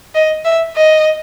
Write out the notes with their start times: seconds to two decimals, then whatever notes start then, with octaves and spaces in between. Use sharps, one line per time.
0.15 D#5
0.45 E5
0.76 D#5